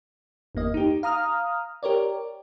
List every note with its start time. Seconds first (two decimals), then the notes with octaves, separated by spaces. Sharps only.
0.55 G1 E2 A#3 D#5
0.74 D#4 G4
1.03 F5 A#5 D#6 F6
1.83 G4 A#4 C#5 D5